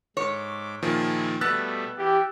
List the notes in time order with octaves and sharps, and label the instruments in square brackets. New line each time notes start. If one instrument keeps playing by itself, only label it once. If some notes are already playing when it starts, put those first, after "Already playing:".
[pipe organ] G#2 D6 [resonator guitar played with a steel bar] C#5
[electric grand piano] A#2 D#3 F3 [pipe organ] E4 F4 G#4
[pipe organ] B2 G3 A3 [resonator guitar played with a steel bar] B3 [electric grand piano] E6 F#6 A6
[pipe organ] E3 [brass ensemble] G4